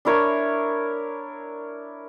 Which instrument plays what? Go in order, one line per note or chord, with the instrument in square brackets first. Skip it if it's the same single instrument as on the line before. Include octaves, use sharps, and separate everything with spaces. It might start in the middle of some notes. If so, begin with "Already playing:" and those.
[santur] D4 E4 A#4 C#5